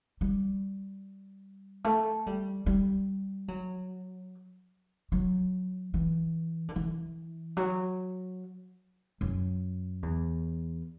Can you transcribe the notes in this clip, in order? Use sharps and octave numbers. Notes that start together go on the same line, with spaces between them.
G3
A3
G3
G3
F#3
F#3
E3
D3
E3
F#3
F#2
E2